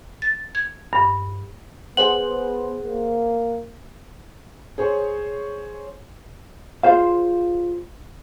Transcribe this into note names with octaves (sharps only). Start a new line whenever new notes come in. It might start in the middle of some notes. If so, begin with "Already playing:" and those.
A6
G#6
G2
B3 G#4 C5 F#5 F#7
A#3
G#4 C5 C#5
F4 G#4 C5 F5